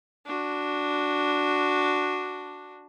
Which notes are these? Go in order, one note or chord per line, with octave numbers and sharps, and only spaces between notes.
D4 F#4